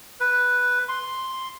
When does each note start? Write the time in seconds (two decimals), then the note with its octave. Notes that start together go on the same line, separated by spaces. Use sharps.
0.20 B4
0.89 C6